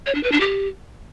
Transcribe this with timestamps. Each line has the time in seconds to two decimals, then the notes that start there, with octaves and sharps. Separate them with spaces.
0.06 C#5
0.15 D4
0.23 B4
0.32 D4
0.40 G4